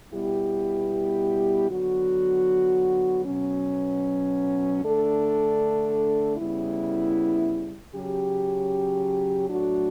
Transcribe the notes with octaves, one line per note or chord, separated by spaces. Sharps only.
B2 G3 B3 E4 G4
D3 F#3 B3 F#4
B2 F#3 C#4
D3 A3 D4 A4
C#3 G3 B3 E4
C#3 F#3 C#4 G4
A2 F#3 A3 D4 F#4